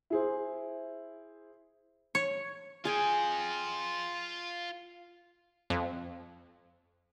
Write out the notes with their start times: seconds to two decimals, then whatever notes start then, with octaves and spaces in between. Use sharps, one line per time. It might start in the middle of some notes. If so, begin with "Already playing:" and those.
0.10 E4 G#4 C5
2.15 C#5
2.85 F4 G#4 G5 G#5
5.70 F2